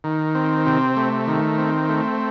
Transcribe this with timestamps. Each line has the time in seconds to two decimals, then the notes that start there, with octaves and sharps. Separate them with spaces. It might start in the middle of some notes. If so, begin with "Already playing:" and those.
0.04 D#3
0.35 C4
0.66 C3
0.97 A3
1.27 D#3
1.58 C4
1.89 A3